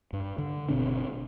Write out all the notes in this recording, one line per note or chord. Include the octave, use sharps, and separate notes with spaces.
G2
D3
G1 B2 C4 D4